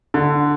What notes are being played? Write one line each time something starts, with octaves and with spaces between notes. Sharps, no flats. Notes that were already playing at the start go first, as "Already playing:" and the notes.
D3